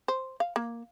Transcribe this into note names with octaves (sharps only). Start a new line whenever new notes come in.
C5
F5
A#3